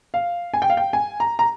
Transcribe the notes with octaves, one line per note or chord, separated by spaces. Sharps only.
F5
G#5
G5
F5
G5
G#5
A#5
A#5